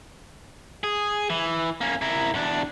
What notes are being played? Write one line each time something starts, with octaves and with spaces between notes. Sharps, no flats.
G#4
E3
A#3 C#4
E4 A#4
E2 D4